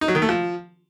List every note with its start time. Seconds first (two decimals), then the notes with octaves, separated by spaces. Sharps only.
0.01 D#4
0.08 F#3
0.15 D#3
0.22 A3
0.29 F3